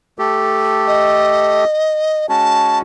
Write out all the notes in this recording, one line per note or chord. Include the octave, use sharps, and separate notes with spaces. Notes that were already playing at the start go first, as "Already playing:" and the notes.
A3 G4 A4
D#5
G#3 C#4 F#4 A5